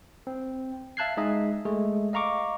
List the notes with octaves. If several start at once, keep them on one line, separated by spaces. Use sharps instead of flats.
C4
E5 F5 A5 F#6 G#6 C7
G#3 D#4 G#4 D#5 E5
G#3 A3 G#4
D#5 F5 A#5 C#6 D6